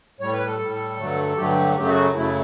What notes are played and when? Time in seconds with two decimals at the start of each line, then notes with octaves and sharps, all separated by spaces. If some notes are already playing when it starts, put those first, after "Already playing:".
0.20 A2 G3 C#5
0.33 B4
0.46 A4
0.59 A2 G3
0.98 G2 D3 F#3 A3
1.37 G2 D3 F#3 A3 G4
1.76 F#2 C#3 F#3 A3 G4
1.89 F#4
2.15 F#2 C#3 F#3 A3 E4